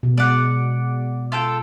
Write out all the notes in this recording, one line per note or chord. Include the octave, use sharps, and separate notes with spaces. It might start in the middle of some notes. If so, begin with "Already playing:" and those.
B2
G#3 D5 F#5
F4 A4 G5